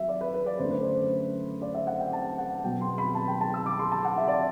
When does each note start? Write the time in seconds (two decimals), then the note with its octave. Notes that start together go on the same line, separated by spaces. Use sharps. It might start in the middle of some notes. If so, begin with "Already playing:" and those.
Already playing: F#3 E5
0.08 D5
0.21 B4
0.34 B4
0.46 D5
0.59 F#2 D3 A3 C5
0.71 B4
0.83 C5
1.62 D5
1.74 E5
1.87 F#5
2.00 G5
2.13 A5
2.38 F#5
2.64 B2 F#3 B3 G5
2.81 C6
2.98 B5
3.15 A5
3.28 G5
3.41 A5
3.54 E6
3.66 D6
3.79 C6
3.92 A5
4.05 F#5
4.18 E5
4.28 D5